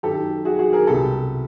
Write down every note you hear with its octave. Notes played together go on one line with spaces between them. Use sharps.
F#2 D#3 G4 A4
F#4 G#4
F#4 G#4
G#4 A#4
C2 B2 G4 A4